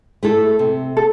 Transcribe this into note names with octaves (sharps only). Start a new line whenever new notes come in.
A3 E4 A4
C3
A4